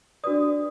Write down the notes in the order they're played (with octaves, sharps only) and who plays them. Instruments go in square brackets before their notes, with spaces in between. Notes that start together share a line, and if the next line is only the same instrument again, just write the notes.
[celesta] D4 F#4 B4 D5 D#6